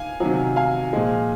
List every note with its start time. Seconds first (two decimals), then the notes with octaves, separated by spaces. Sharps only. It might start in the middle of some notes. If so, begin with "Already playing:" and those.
Already playing: F5 G#5
0.20 C3 D#3 F#3
0.56 F5 G#5
0.93 A#2 F3 G#3